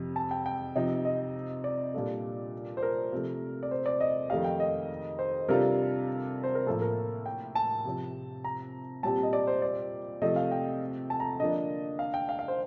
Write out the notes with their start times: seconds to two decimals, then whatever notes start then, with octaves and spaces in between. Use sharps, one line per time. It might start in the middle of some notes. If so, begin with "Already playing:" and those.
Already playing: F2 C3 C4 G4
0.16 A5
0.31 G5
0.46 G5
0.75 C3 F3 C4 D#4
1.05 D#5
1.64 D5
1.94 A#2 G3 D4 F4 A4
2.77 C5
2.83 A#4
3.12 C3 F3 A3
3.63 D5
3.71 C5
3.86 D5
4.01 D#5
4.30 F2 D#3 A3 D#4 G4 F5
4.44 G5
4.60 D#5
5.19 C5
5.48 C3 G3 D4 F4 A4 A#4
6.44 C5
6.55 A#4
6.66 A2 F3 A#3 A4
6.82 A#4
7.26 G5
7.55 A5
7.85 C3 F3 C4
8.44 A#5
9.03 A#2 G3 C4 G4 A5
9.23 D#5
9.33 D5
9.47 C5
9.62 D5
10.22 C3 F3 A3 C4 D#5
10.36 F5
10.52 G5
11.10 A5
11.20 A#5
11.40 D3 F3 A#3 D4 D#5
11.99 F5
12.14 G5
12.29 F5
12.39 F5
12.48 C5